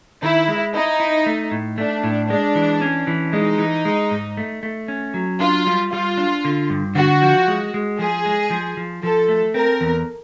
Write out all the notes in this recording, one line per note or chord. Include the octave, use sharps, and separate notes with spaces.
D#3 E4
G#3
D#4 E4
E4
A3
A2
A3 D4
A2
G#3 D4
E3
C#4
E3
G#3 D#4
E3
G#3
G#2
A3
A3
C#4
F#3
D4 F4
G3
G3 F4
D4
D3
G2
D3 F#4
F3
G#3
G#3
F3 G#4
G#3
F3
F3
F3 A4
A3
C4 A#4
E2